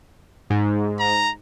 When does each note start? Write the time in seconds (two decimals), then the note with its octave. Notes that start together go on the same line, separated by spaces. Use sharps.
0.50 G#2
0.99 A#5